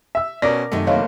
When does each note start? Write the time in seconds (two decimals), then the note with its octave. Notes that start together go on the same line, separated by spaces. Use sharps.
0.15 E5 E6
0.42 B2 C#4 A#4 D5 D6 A#6
0.72 F#2 C3 D#3 A3
0.87 F#1 A#3 C#5 D#5 F5